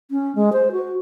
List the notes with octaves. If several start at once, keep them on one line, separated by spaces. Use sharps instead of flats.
C#4
G#3
C5
F#4